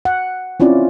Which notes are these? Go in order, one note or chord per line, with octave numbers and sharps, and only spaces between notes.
F#5
C4 C#4 E4 F4 D5